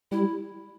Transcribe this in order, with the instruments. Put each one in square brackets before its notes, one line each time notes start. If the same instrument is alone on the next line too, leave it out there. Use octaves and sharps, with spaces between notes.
[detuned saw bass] G3 [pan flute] E4